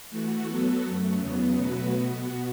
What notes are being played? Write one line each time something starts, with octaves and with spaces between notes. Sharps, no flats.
E3 A3 F#4
F#3 B3 F#4 A4
F#2 F#3 A3
E2 C#3 F#3 B3
B2 F#3 A3 F#4 B4
B2 B3 F#4